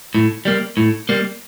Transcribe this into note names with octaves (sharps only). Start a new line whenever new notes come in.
A2
G3 A#3
A2
G3 A#3